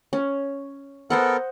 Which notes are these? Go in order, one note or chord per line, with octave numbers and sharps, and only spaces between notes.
C#4
B3 A4 A#4 C5 D#5 F#5